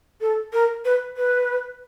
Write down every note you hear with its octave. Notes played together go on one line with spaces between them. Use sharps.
A4
A#4
B4
B4